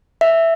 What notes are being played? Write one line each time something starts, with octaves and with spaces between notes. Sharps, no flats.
E5